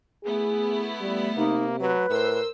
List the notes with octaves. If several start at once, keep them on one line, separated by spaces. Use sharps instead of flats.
A3 B3 E4 G#4
G3
C3 A#3 D#4
F#3 B4
A2 A#4 C5 E6